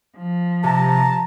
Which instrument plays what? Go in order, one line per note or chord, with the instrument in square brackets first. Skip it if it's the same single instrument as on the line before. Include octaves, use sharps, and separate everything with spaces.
[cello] F3
[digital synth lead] C3 [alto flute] A5 [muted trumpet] A#5